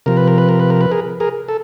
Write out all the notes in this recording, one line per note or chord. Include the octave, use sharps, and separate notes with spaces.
C3 F3 A#4
B4
A#4
B4
A#4
B4
A#4
B4
G#4 A#4
G#4 A#4
A4